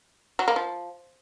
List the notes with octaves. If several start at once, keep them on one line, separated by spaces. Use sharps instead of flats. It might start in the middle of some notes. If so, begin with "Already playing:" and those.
F#3
A#3
F3